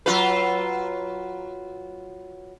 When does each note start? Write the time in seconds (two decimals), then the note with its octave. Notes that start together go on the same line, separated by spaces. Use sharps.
0.06 F#3 F4 B4